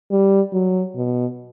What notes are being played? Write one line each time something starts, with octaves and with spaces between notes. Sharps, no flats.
G3
F#3
B2